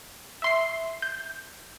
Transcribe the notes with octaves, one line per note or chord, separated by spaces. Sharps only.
E5 C6 C7
G6